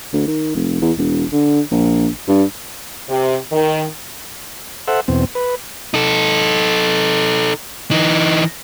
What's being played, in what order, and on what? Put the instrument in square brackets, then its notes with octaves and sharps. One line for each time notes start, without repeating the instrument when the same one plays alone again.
[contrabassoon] D2
D#3
F1
E2
E1
D3
A#1
G2
[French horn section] C3
D#3
[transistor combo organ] A4 C5 E5 F#5
E2 B2 C4
B4
[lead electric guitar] D#4 A4
E3 D#4